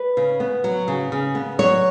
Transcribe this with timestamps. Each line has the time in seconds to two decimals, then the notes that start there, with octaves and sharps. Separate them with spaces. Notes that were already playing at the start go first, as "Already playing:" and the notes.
Already playing: B4
0.17 C#3
0.40 B3
0.64 F#3
0.88 C#3
1.12 C#3
1.35 B3
1.59 F#3 C#5